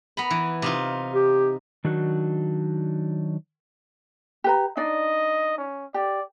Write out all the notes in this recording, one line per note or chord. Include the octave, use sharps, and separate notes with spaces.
B3 A#5 B5
E3
C3 D#4 F4
G4
D#3 F#3 D4 D#4 F#4
G4 B4 A#5
D4 D#4 D5 D#5
C#4
G4 D5